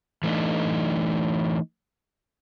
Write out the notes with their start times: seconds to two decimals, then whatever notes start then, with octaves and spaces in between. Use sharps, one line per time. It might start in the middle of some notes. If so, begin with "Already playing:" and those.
0.23 E3 A3 D4 D#4